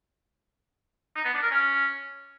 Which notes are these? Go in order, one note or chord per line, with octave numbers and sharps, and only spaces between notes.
D#4
B3
D4
A#4
C#4